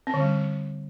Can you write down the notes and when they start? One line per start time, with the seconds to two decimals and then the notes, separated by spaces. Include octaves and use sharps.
0.07 C4
0.14 D3
0.21 G3